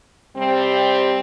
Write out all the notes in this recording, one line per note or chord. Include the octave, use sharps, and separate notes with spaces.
C3 G3 C4